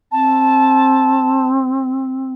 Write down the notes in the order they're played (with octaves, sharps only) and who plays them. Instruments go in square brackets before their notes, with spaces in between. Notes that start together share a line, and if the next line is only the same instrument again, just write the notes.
[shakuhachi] C4 [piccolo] A5